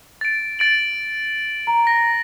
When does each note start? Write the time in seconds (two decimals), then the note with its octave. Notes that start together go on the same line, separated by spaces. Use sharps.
0.21 A6 D7
0.59 A6 D7 F#7
1.67 A#5
1.87 A#6